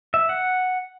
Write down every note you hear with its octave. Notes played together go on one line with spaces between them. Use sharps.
E5
F#5